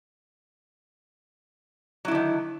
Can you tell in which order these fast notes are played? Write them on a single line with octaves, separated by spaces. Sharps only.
F#3 E4 D3 D#3